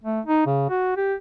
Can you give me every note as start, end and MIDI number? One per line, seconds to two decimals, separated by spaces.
0.04 0.21 57
0.25 0.42 63
0.46 0.67 49
0.69 0.93 66
0.97 1.14 67